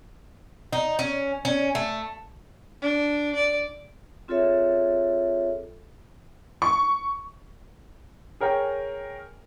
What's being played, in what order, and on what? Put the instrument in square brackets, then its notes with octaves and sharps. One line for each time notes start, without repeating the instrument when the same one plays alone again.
[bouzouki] D#4
C#4
C#4
A3
[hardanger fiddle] D4
D5
[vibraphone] C4 F4 G#4 A4 C#5 E5
[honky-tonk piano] C#6
[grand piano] G#4 A#4 C#5 G5 G#5